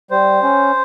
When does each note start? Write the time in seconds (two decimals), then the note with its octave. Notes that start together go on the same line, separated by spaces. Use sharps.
0.11 G3 C5
0.43 C#4